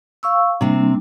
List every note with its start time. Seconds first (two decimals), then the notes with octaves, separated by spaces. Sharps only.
0.23 F5 C#6 E6
0.61 C3 G3 A#3 C4 D4